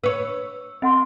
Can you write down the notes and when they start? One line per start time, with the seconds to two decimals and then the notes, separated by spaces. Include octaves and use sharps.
0.04 B4 C#5 E6
0.82 C4 D#5 F#5 C6